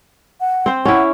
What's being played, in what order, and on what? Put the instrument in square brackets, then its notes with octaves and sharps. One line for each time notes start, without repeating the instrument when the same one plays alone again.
[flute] F#5
[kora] C4 C5
[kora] C#4 E4 [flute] F#5